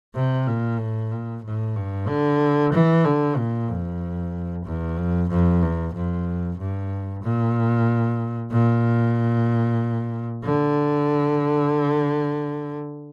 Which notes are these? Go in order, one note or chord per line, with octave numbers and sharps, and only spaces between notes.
C3
A#2
A2
A#2
A2
G2
D3
E3
D3
A#2
F2
E2
F2
F2
E2
F2
G2
A#2
A#2
D3